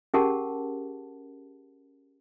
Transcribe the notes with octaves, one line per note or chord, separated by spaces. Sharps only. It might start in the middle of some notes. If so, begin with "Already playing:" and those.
C#4 G4 G#4 A#4 F#5 A5